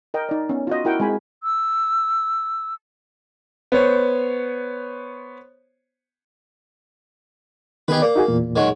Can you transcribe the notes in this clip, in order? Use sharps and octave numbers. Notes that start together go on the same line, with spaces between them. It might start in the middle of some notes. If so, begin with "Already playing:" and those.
A#4 D#5 G5
D#4 D5
B3 C#4
F4 F#4 D#5
E4 F#4 A#4 F#5 G5
G#3 C4 G#5 B5
E6
B3 C5 C#5
D#3 B3 G4 G#4 B4 D#5
A#3 D5
D#4 F#4 G#4
E2 A#2
D#3 F#3 G#3